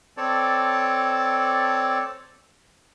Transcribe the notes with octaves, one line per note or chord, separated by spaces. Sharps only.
C4 A4 C#5 D5 A5